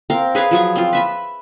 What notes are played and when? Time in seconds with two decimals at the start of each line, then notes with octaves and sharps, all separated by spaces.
0.10 C4 A#4 F5
0.35 G#4 B4 C#5 F5
0.51 F3 F#3 C#6
0.76 C4 F4
0.93 B4 E5 B5